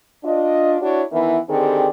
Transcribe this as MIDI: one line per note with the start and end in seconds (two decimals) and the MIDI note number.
0.24 0.77 62
0.24 0.77 65
0.24 0.77 75
0.81 1.03 62
0.81 1.03 64
0.81 1.03 66
0.81 1.03 73
1.12 1.39 51
1.12 1.39 52
1.12 1.39 59
1.12 1.39 64
1.49 1.88 50
1.49 1.88 51
1.49 1.88 60
1.49 1.88 67
1.49 1.88 68
1.49 1.88 74